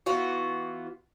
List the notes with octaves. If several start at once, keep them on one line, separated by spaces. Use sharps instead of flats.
E3 B3 F4 F#4